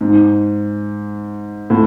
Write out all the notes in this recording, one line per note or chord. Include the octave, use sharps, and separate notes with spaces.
G#2
A2